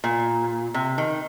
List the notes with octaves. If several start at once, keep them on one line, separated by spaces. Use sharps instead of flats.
A#2
C3
D#3